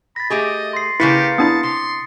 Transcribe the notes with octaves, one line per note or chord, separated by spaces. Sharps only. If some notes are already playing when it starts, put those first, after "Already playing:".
B5 A6 A#6
A3 G4 G#4 D#5
C6 A#6 C7
C#3 A#3 E4 G4 B4 A6 B6 C#7
B3 D4 E4 A5 D#6
C3 C6